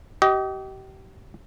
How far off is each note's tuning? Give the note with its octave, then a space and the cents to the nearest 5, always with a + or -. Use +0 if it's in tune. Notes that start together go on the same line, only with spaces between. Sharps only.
G4 -35 D#5 +15